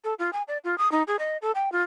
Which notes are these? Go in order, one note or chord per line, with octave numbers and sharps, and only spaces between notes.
A4
F4
G#5
D5
F4
D#6
D#4
G#4
D#5
A4
G5
F4